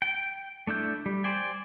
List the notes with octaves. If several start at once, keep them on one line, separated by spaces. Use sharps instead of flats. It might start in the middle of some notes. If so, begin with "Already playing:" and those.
G5
A3 D4 E4 G6
G3
C5 D5 G5 G#5